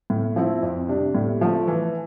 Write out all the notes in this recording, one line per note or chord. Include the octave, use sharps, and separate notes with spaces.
A2
F3 C4 E4
F2
C3 G3 D4
A2
F3 A3
E3